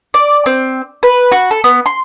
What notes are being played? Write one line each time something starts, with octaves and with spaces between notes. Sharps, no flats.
D5
C4
B4
F#4
A4
B3
C6